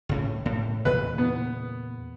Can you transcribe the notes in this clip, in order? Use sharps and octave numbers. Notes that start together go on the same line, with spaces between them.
C#2 A2 C#4
A2
E2 A#2 C#3 B4
B3